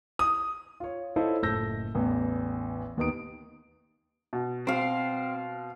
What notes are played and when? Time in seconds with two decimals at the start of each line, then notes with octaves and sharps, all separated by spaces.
0.19 D#6
0.80 F4 C#5
1.16 E4 F4 A4 C5 C#5 D#5
1.42 F#1 A2 A4 E6 G6 A#6
1.95 A1 E2
2.97 D#2 B3 D#4 D#6 D7
4.33 B2
4.67 C4 F5 C6